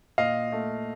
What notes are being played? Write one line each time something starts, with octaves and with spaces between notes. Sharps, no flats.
A#2 D#5 F5
A3